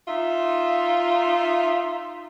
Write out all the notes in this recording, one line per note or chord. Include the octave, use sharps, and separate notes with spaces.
D#4 F4 E5